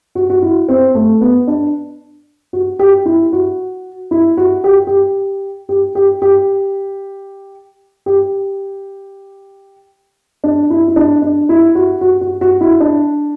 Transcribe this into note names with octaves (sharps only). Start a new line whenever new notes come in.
F#4
F#4
E4
C4
A3
B3
D4
F#4
G4
E4
F#4
E4
F#4
G4
G4
G4
G4
G4
G4
D4
E4
E4
D4
D4
E4
F#4
F#4
F#4
F#4
E4
D4